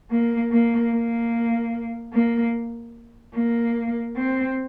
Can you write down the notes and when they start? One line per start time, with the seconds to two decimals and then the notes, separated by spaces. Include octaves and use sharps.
0.11 A#3
0.52 A#3
0.92 A#3
2.13 A#3
3.35 A#3
4.16 C4